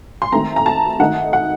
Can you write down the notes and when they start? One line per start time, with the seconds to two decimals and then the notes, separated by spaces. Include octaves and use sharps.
0.22 C6
0.32 D#3 A3 C4 A#5
0.56 A#5
0.66 A5
1.00 D#3 A3 D#4 F#5
1.33 F#5